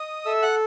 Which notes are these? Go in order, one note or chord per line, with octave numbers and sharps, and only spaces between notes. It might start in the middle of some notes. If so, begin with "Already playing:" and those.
Already playing: D#5 D#6
A4 E5 E6
F#5 F#6